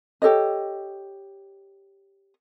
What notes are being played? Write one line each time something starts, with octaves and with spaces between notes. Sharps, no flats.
G4 A4 C#5 D#5